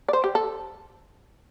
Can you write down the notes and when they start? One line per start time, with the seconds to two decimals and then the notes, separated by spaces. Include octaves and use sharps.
0.09 D5
0.13 C5
0.24 G4
0.35 A4